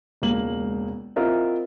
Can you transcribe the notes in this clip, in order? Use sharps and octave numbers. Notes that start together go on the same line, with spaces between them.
E1 C#2 A#3 F#7
C4 E4 F4 A#4 D#5 E5